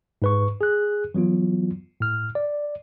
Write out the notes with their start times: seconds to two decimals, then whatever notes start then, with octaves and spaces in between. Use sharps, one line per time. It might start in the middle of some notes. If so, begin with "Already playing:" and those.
0.22 G#2 B4 C#6
0.61 G#4 F#6
1.15 E3 F#3 B3 F4
2.00 A2 F6
2.35 D5